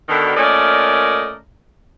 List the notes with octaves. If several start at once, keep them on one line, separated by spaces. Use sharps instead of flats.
B2 D3 D#3
A#2 A3 C#4 A#4 D5 D#5